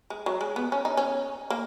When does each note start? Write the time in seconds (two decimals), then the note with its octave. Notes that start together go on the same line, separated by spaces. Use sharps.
0.10 G#3
0.26 F#3
0.41 G#3
0.56 B3
0.72 C#4
0.85 D#4
0.97 C#4
1.50 A#3